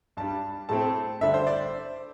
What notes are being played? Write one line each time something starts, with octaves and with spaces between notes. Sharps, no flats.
G2 G3 D4 A5
A2 A3 C4 A5
G2 D3 G3 D4 E5
C5
D5